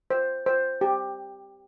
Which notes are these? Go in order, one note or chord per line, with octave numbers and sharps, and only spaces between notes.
C5
C5
G4